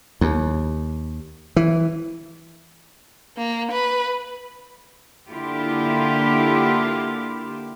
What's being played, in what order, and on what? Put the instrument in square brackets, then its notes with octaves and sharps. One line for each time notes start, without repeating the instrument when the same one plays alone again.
[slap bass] D#2
E3
[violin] A#3
B4
[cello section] D3 A#3 E4 F4 G4